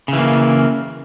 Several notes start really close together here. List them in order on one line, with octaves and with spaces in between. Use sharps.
C#3 E3 A#3